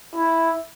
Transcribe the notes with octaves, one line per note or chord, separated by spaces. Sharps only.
E4